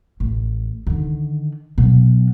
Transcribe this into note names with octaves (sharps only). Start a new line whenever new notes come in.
A1
D3 D#3
B2 F#3